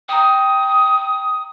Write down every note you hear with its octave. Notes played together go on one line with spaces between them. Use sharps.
G5 A#5 D#6